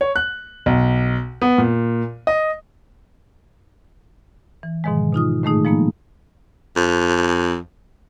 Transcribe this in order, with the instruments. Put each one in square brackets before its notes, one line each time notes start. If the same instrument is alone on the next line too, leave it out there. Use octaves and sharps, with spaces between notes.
[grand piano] C#5
F#6
B1
B3
A#2
D#5
[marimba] E3
G#2 B2 D#3 F3 G#3
B2 D#4 F4 D#6
A2 D#3 G#3 A3 D#4 G#4
F3 G#3 A#3 B3 D#4
[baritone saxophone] F2